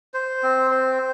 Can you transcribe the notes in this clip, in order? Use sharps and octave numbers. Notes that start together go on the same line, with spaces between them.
C5
C4
C5